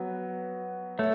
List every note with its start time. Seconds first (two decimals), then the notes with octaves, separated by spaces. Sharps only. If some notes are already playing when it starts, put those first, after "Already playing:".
Already playing: F#3 B3 F#4 B4
0.99 A3 C#5